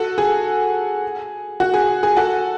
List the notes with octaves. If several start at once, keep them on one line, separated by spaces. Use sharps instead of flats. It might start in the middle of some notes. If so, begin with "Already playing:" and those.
Already playing: F#4 A4
G#4
F#4
G#4
G#4
F#4 A4